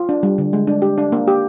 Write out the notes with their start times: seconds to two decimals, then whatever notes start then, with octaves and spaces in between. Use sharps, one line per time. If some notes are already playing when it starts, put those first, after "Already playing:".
Already playing: F4
0.09 D4
0.23 G3
0.38 D3
0.53 G#3
0.67 D4
0.82 G4
0.98 D4
1.12 A#3
1.28 G4